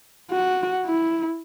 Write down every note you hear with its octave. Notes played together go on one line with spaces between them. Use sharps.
F#4
E4